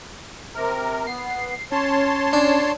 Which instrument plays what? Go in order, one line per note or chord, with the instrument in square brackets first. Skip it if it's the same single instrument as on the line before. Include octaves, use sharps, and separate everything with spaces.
[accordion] C3 A#4
[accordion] B3 [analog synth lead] C7
[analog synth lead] C#4 [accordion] C#5 A5 C6
[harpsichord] D4